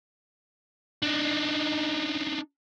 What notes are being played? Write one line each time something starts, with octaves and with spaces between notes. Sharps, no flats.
D4 D#4